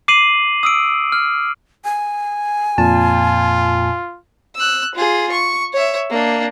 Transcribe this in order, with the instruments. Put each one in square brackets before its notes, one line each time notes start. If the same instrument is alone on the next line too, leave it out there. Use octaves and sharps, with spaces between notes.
[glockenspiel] D6 C7 D#7 F#7
D#6 E6 D7
F6
[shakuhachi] G#5
[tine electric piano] F2 A#2 A5 [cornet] F4
[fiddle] E6 F#6
F4 G#4
C#6
C#5 E5
A#3 D4